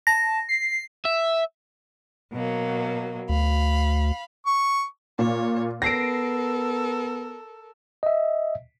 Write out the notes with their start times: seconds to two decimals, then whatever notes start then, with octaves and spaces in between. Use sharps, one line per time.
0.07 A5 A#6
0.49 C7
1.05 E5
2.33 B2 F#3 A#3
3.29 D2 F5 B5
4.46 C#6
5.19 A#2 C#5
5.82 B3 A4 A#4 A#6 C7 D7
8.03 D#5 E5